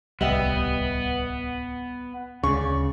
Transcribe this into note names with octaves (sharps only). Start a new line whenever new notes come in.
D1 C2 G3 B3 D#5 E5 G5
D2 C#3 G#3 D5 C#6